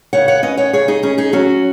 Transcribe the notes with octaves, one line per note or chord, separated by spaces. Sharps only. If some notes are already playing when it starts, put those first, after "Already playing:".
C#3 C#5 F#5
C#5 F#5
C#4 B4 D#5
C#5 F#5
C#3 G#4 C#5
D#4 G#4
C#4 D#4 G#4
D#4 G#4
F#3 C#4 F#4